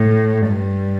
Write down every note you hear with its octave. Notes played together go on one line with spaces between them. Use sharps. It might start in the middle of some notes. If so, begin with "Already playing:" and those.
Already playing: A2
G2